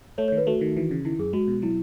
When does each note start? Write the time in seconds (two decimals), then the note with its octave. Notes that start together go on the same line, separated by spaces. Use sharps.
0.18 A3 C#5
0.28 C#5
0.32 D#3
0.37 B4
0.47 A3 F#4
0.61 D#3
0.77 E3
0.91 C#3
1.05 D#3 E4
1.19 F#2 G#4
1.33 G#3 F#4
1.48 B2
1.62 F#3 E4